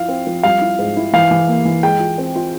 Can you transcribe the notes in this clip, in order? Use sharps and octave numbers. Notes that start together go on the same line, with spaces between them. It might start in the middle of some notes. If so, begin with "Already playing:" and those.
Already playing: F3 E4 F5
C4
F3
G3 F5
E4
G#2
E4
E3 F5
E3
A#3
E3
G#3 G5
F4
C4
F4